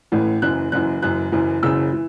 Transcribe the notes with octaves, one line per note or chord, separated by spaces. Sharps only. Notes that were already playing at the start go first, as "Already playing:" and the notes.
A1 A2 E3
F#1 F#2 E3 F#6
F#1 F#2 E3 F#6
F#1 F#2 E3 F#6
F#1 F#2 E3
F#1 F#2 C#3 E3 E6
E3